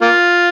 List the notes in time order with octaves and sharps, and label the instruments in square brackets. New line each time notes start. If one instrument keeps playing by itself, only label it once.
[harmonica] A#3 F4